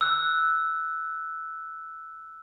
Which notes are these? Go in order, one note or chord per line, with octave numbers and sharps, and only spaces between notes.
E6 F#6